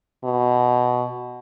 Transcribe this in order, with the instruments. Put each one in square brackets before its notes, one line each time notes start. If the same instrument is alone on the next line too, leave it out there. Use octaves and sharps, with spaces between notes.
[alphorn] B2